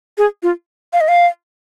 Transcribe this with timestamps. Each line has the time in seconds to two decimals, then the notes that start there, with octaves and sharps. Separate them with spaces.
0.18 G#4
0.43 F4
0.93 F5
1.01 D#5
1.08 F5